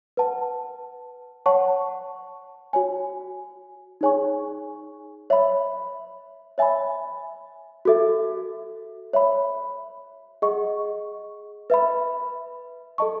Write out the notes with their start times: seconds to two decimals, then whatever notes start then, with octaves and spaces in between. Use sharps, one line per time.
0.17 B4 F#5 A5
1.46 C#5 F#5 A5 C#6
2.73 F#4 C#5 G#5
4.01 D#4 G#4 C#5 G#5 C#6
5.30 C#5 E5 B5
6.58 C#5 E5 G#5 B5
7.85 F#4 A4 E5
9.13 C#5 E5 B5
10.42 G#4 D#5 F#5 C#6
11.70 B4 E5 B5
12.98 A4 D#5 A5 C#6